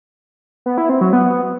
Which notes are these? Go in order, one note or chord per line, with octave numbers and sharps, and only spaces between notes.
B3
E4
C4
F#3
B3